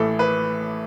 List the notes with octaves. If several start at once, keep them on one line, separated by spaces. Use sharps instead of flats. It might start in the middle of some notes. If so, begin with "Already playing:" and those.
Already playing: A1 A2 E3 A4
B4